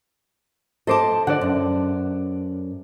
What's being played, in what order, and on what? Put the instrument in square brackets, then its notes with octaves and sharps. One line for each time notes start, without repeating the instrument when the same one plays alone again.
[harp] A4 C5 D6 [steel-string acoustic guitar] D#5 G#5 A5
[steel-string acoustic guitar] D3 [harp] D5 F#5
[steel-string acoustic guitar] F#2